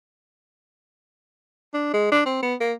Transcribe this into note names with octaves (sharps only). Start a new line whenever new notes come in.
D4
G#3
D4
C4
B3
A#3